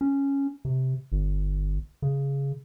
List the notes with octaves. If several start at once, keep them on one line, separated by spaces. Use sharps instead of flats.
C#4
C3
G1
C#3